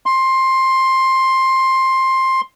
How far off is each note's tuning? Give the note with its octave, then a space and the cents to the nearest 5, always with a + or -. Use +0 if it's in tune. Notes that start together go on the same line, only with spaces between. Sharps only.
C6 +15